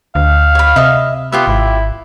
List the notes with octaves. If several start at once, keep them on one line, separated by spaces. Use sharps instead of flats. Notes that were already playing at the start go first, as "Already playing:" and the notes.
D2 F5
C#5 B5
C3 D#5 E5
B3 F4 G4 E5
G#1 E4